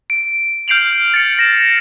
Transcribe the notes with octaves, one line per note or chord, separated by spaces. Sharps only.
D7
F6 G6 C7 D7 F7 F#7
A6 C#7
A#6 E7